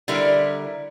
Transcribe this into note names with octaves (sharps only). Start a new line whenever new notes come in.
D3 G3 E4 A#4